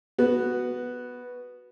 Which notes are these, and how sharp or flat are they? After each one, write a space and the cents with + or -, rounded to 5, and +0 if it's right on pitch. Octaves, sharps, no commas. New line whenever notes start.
B3 +0 F#4 +0